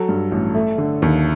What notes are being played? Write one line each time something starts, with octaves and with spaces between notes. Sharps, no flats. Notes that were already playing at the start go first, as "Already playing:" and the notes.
Already playing: F#3 A4
G2
A1
A3
D3
D#2